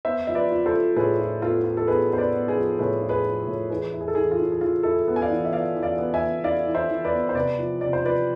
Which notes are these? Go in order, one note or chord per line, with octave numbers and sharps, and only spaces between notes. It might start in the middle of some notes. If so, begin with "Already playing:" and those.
B3 C5 E5
F3 E5
B4 D5
F4
A4 C5
F4
A2 G#4 B4
F4
B3 F4 A4
F4
A4
B3 G#4 B4
B3 C5
B4 D5
B3
G#4 B4
F3
A2 G#4 B4
F4
G#4 B4
F3
A2
E3 G#4 B4
E4
G#4
A4
E3 G#4
F4
E3
G#4
E3 F4
E4 A4
G#4
B3
G#5
D5 F5
E3
E5
B3 D5 F5
E3
D5 F5
B3
E5 G#5
B3
E4 D5 F5
E3
C5 E5
E3
B4 D5
B3
C5
C3 B4 D5
F3
C3 D5
C5
F3 B4 D5